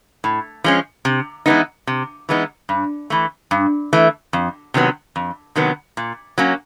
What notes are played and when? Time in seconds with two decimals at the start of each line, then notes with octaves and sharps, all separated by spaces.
0.24 A2
0.64 F3 G#3 C#4
1.05 C3
1.46 E3 G#3 B3 D#4
1.87 C3
2.29 E3 G#3 B3 D#4
2.69 G2
3.10 E3 A3
3.51 G2
3.93 E3 A3
4.33 F2
4.74 C3 D#3 F#3 B3
5.16 F2
5.55 C3 D#3 F#3 B3
5.97 A#2
6.38 F#3 A#3 C#4